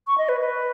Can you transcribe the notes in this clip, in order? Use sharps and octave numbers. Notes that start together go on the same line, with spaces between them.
C#6
D#5
B4
B4